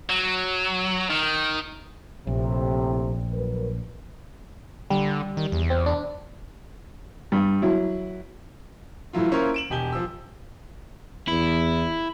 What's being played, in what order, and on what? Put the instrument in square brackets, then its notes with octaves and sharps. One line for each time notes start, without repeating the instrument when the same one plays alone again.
[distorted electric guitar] F#3
D#3
[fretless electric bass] A#1 [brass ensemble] A2 C3
[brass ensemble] F#3 A#4 B4
[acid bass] D3 [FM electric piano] G3
[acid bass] D#3
E2
[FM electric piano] C4
D4
[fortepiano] G2
F#3 E4
[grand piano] A2 E3 F#3 E4 F4
A#3 C#4 E4 A#4 C5 C#5
D7 E7 F#7
E1 G4 G#5 G7
F3 E6
[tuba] E2 [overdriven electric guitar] E4